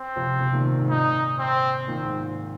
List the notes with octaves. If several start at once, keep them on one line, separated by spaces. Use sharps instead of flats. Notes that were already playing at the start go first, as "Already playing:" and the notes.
Already playing: C4
C3 F3
C3 F3
A#2 D#3
A#2
G#2
A#2 D#4
C4
A#2 D#3 C4
G#2
A#2